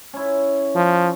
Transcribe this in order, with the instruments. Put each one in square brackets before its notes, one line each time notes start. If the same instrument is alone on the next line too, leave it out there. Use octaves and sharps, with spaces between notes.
[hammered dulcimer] C#4 E4
[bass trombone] F3